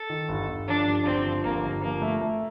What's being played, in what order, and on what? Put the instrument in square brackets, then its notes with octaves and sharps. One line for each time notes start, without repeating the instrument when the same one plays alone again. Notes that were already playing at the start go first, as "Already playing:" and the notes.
Already playing: [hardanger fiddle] A4
[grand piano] D#3
G1
G1
[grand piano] F3 [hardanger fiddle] D4
[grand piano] G2
[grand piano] G1 [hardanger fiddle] C4
[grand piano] F3
[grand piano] G1 [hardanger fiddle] A#3
[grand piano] G1
[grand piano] F3 [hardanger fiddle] A#3
[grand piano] A3
A3